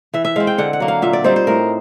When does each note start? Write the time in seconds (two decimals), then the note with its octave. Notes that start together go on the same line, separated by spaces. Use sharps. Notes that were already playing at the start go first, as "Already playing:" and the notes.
0.14 E3 E5
0.25 E5
0.36 G#3 C4 F5
0.47 G5
0.58 D3 F#5
0.73 F#5
0.80 F#3 A#3
0.88 F5
1.02 A#2 E5
1.13 D5
1.24 G3 C4 D#4 C5
1.36 C5
1.47 A2 A#4